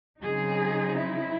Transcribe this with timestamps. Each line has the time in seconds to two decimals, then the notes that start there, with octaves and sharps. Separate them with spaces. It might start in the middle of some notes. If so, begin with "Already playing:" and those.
0.21 C#3 F#3 C4 D#4 G#4
0.97 E4